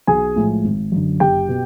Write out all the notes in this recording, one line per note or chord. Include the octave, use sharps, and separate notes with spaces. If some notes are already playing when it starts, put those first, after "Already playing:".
B1 G#4 G#5
A2 F3 G#3
G#1
F#2 D3
F#1 G4 G5
B2